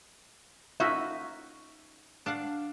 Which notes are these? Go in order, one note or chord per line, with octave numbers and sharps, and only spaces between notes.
C#4 D#4 F4 F#4 E5
D4 F5 F#5